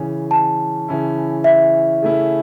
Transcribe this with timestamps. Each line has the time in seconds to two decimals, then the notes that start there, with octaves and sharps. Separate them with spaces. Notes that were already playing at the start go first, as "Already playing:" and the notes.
Already playing: C#3 E3 C#4
0.31 A5
0.88 C#3 E3 C#4 E4
1.44 E5
2.02 C#3 A3 C#4 E4